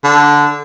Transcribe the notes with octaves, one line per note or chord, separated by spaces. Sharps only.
D3